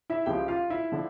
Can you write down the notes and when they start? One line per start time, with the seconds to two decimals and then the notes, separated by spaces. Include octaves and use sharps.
0.10 E4 E5
0.26 C#2 C#3 F3 G4 G5
0.48 F4 F5
0.70 E4 E5
0.92 D3 F3